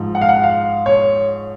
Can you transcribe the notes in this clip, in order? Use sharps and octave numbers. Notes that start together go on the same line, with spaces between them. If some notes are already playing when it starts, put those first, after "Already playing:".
Already playing: G#2 F3 G#3
F#5
F5
F#5
F5
C#5